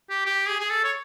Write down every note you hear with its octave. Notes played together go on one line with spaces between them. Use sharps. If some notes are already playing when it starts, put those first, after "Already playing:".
G4
G4
G#4
G#4
A4
C#5